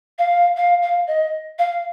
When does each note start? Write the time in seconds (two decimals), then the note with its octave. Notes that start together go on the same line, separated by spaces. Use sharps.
0.19 F5
0.57 F5
0.82 F5
1.07 D#5
1.59 F5